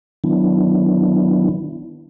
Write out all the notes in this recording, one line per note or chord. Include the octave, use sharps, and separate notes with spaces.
D#3 F#3 B3 D4 E4